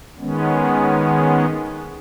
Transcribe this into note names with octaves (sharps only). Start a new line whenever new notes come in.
D#3 G#3 B3 C#4